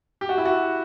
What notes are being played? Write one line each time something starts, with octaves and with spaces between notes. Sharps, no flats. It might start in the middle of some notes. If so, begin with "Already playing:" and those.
G4
F#4
E4
F#4